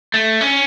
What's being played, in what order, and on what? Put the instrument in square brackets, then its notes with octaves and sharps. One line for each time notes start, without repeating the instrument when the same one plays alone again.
[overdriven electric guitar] A3
C#4